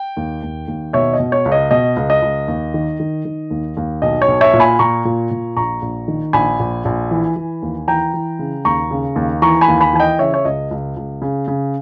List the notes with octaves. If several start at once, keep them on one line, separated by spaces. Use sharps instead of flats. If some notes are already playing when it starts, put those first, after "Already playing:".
Already playing: G5
D#2
D#2
D#2
B2 C#5 E5
D#5
B2
C#5
C#2
D#5
B2 D#5
C#2
D#5
C#2
D#2
D#3
D#3
D#3
D#2
D#2
B1 D#5
C#5
B1
C#5 E5
A#2
G#5 B5
A#2 A#5 C#6
A#2
A#2
A#1 A#5 C#6
A#1
D#3
A#1 G#5 B5
A#1
A#1
E3
E3
D#2
E3 G5 A#5
E3
C#3
D#2 A#5 C#6
C#3
D#2
E3 A#5 C#6
G#5 B5
D#2
G#5 B5
E3 G#5
D#5 G5
C#3 C#5 E5
C#5
C#2 D#5
C#2
C#2
C#3
C#3